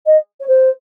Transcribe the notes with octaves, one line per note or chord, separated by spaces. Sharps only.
D#5
C#5
C5